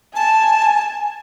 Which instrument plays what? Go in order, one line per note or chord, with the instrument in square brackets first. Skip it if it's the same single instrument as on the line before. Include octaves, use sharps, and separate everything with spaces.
[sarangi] G#5 [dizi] A5